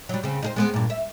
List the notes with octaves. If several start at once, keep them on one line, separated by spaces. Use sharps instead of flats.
F#3 G3
C#3 C4
D#4 G#4 C5
G#3 B3 C4
G2 A#2
E5